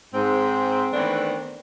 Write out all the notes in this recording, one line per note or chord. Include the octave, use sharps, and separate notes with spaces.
G#2 C4
D#3 E3 A3 B3 C4 D4